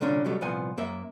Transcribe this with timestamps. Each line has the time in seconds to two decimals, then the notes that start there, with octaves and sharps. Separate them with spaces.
0.01 C2 A#2 D3 C#4 D4
0.24 C2 B2 F#3 G3 A3
0.41 C2 A#2 F3 B3 G#5
0.78 F#2 A#3 E5